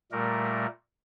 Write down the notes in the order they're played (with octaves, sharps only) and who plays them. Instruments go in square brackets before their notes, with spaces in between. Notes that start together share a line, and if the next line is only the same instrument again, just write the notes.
[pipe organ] A#2 G3 A3 A#4